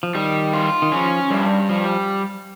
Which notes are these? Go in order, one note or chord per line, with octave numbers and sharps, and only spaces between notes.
F3
D#3 G3
F4
D#3
F3 C#4
G2 G3
F3 G3